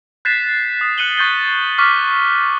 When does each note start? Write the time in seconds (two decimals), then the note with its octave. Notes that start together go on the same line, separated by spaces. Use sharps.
0.25 F#6 G6 A6 B6 C7 E7
0.81 D#6
0.98 F#6 C#7 D#7 F#7 G7
1.17 C#6 G6 A6 G7
1.78 C#6 D6 F6 F#6 B6